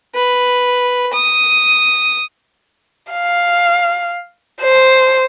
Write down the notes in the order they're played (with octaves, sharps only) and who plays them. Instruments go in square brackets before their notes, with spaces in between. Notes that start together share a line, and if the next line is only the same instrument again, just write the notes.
[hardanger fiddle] B4
D#6
[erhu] F5
C5